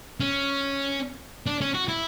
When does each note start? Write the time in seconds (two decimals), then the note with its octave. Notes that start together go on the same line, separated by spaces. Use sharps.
0.20 C#4
1.46 D4
1.61 C#4
1.74 F#4
1.88 E4